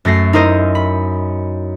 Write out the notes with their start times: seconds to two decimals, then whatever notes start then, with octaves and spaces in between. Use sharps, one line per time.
0.05 F#2 A3 A#6 C7
0.33 D#4 E4 A#4 C5 D#5
0.75 B5